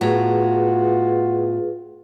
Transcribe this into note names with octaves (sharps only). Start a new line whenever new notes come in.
A2 B3 F4 F#4 G#4 B4 A#5